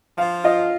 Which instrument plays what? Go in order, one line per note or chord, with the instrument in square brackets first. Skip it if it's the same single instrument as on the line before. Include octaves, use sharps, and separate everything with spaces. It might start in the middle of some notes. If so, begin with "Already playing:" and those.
[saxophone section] F3 [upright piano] F5
[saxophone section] F4 [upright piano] D#5